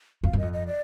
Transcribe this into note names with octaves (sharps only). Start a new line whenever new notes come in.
F2 F5
F#2
F2 D#5
D#5
D5